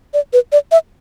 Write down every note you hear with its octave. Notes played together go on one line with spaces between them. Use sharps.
D5
B4
D5
E5